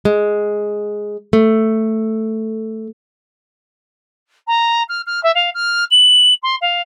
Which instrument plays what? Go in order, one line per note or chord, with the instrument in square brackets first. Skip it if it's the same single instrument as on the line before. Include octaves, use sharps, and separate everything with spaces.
[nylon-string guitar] G#3
A3
[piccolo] A#5
F6
F6
E5
F5
F6
F#7
C6
F5